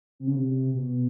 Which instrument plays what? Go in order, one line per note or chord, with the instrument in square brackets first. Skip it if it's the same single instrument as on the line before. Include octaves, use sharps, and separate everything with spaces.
[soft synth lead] C3
C#3
C3
B2